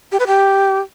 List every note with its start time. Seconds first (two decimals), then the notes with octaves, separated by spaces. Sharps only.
0.12 G4
0.19 B4
0.27 G4